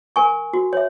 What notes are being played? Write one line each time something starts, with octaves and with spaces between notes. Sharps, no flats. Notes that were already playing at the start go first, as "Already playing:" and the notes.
A#4 G#5 C#6
F#4
C#5 E5